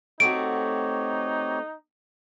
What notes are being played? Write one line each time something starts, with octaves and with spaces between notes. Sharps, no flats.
A3 C4 D#4 F#4 G4 C#5 D7